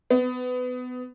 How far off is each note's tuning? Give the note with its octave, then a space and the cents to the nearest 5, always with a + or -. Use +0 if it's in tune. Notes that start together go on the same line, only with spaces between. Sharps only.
B3 +25